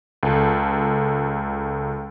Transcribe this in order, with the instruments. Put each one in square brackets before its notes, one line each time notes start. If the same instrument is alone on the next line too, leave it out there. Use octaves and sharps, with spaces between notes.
[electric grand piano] C#2 A4 A5